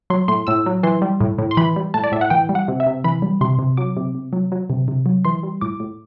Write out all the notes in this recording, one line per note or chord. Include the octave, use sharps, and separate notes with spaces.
F#3 C6
A2 C6
A2 E6
F#3
E3 C6
G3
A2
A2
C6
E3 B5
G3
A2 A5
D5
A2 E5
F#5
E3 G5
G3
F#5
C3
E5
C3
E3 B5
G3
C3 C6
C3
F#3 D6
C3
C3
F#3
F#3
C3
C3
F#3
E3 C6
G3
A2 D6
A2